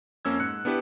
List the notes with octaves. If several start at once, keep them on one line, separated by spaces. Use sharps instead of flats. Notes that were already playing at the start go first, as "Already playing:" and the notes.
F2 A#3 C#4 E6 G#6
G#2 F#6 C#7
B3 D4 E4 G4 B4